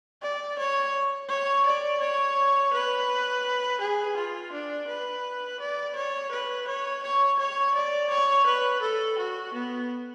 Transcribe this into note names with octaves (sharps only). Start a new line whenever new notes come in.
D5
C#5
C#5
D5
C#5
B4
G#4
F4
D4
B4
D5
C#5
B4
C#5
C#5
C#5
D5
C#5
B4
A4
F#4
B3